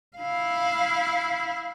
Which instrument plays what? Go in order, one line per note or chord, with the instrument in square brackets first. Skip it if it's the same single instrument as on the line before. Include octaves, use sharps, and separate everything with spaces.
[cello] E4 F5